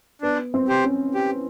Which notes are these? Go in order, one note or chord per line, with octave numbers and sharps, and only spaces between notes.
B3 D4
C4
G4 C5
C#4
G4